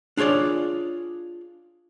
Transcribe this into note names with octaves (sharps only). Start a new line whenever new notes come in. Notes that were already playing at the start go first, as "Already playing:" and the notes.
D4 F4 G#4 C#5 D5